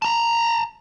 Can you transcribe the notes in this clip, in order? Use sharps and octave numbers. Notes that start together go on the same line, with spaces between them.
A5 A#5